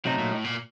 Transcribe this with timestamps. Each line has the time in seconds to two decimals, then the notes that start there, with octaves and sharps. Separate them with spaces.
0.05 C3 F#3 A3 D#4
0.18 A#2
0.32 A2
0.44 A#2